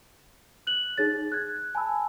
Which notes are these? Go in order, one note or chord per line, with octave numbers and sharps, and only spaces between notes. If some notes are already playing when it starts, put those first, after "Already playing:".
F#6 F#7
D#4 G#4 C#5 A6
F#6 G#6
G#5 A5 B5 E6